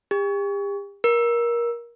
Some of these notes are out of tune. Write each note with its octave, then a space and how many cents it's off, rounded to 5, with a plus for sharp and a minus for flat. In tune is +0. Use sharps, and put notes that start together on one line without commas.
G4 +40
A#4 +20